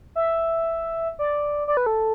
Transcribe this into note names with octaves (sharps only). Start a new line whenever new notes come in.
E5
D5
D5
B4
A4